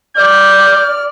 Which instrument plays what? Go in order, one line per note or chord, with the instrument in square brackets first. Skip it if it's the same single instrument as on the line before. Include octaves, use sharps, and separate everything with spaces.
[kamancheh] D5 [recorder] F6 [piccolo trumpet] G6